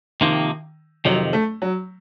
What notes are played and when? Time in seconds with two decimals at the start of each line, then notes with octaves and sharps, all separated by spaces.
0.21 C3 D#3 F3 A#3
1.05 F2 C3 D#3 F#3
1.33 A3
1.62 F#3